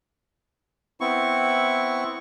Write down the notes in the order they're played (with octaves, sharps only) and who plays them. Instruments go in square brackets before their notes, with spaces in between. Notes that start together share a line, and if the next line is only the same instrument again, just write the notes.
[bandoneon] B3 C4 E4 C#6